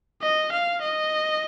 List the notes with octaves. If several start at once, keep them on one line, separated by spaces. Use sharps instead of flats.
D#5
F5
D#5